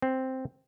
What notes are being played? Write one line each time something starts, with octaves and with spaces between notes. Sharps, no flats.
C4